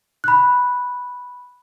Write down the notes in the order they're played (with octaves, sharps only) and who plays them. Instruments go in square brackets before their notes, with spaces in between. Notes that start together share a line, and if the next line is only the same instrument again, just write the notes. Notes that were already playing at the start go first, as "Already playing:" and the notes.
[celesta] B5 F#6